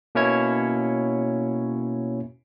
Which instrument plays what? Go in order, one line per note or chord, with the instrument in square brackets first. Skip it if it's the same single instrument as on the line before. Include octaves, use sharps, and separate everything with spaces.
[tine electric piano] B2 A#3 C#4 E4 C#5 G#6